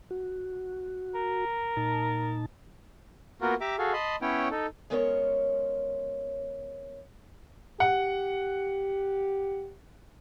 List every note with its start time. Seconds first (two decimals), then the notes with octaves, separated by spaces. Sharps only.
0.11 F#4
1.14 A#4
1.77 A#2 D#4 A5
3.41 A#3 B3 F4 F#4 A#4
3.61 G4 E5 A#5 D6
3.78 F#4 G#4 A4 F5
3.93 D#5 A5 B5 C6
4.22 B3 C#4 E4 C#5 G5
4.51 D#4 A4
4.90 G#3 B3 C#4 A#4 C5 C#5
7.80 G4 F#5